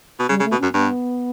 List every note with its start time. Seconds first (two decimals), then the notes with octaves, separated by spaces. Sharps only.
0.20 B2
0.29 C#3 G3
0.40 C#3
0.44 A3
0.51 B2
0.59 F#2 C#4
0.74 G2 B3